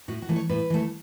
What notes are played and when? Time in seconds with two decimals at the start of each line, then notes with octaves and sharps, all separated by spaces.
0.08 A2 F#4
0.22 F#4
0.29 E3 A3
0.36 C#5
0.49 A2 B4
0.70 E3 A3